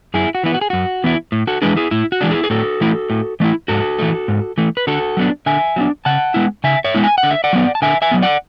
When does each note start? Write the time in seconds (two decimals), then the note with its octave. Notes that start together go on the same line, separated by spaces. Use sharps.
0.14 F#2 E4 G#4
0.35 F#4
0.43 E3 B3 E4
0.54 F#4
0.61 G#4
0.70 F#2 F#4
1.04 E3 B3 E4
1.32 A2
1.47 F#4 A4
1.62 E3 G#3 D4 G#4 B4
1.76 E4 G#4
1.91 A2 E4
2.12 F#4
2.21 E3 G#3 D4
2.31 E4 G#4
2.44 G#4
2.50 A2 F#4 A4
2.81 E3 A3 E4
3.10 A2
3.40 E3 A3 E4
3.68 G#2 F#4 A4
3.99 E3 A3
4.28 G#2
4.58 E3 A3
4.77 B4
4.87 D3 F#4 A4
5.17 F#3 B3 D4
5.46 D3 E5 G#5
5.76 F#3 B3 D4
6.05 C#3 F#5 A5
6.34 G#3 B3 E4
6.64 C#3 E5 G#5
6.84 C#5 E5
6.95 G#3 B3 E4
7.04 G#5
7.18 F#5
7.23 D3
7.31 E5
7.44 D5 F#5
7.53 F#3 B3
7.75 A5
7.82 D3 E5 G#5
8.02 E5 G#5
8.11 F#3 B3
8.22 D5 F#5